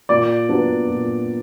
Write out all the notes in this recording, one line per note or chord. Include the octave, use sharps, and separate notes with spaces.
A#2 D5
F#3 B3 D4
A#2